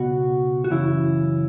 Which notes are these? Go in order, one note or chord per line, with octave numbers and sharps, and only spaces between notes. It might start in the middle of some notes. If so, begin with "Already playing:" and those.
Already playing: C#2 B2 F#4
F#4
F#2 C#3 E3 E4